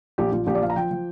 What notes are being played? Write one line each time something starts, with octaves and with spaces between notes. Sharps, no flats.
A#1 G4
A#1 F4
A#1 G4
D5
F3 F5
A#5
F3 G5
F3